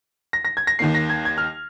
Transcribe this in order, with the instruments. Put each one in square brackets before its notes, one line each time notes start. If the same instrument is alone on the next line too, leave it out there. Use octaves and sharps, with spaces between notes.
[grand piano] A#6
A#6
G#6
A#6
[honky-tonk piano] D#2 D#3 A#3 [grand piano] C7
[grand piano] A#6
G#6
G#6
F6